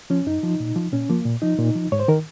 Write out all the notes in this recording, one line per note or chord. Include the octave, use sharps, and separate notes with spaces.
F3 C#4
F#2 D#4
F3
A#2
F3
A#2 C#4
F3 A#3
A#2
F3 D#4
A#2
F3
G#2 C#5
C5
D#3 A#4